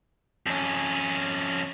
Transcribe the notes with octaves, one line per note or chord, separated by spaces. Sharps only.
F2 C#4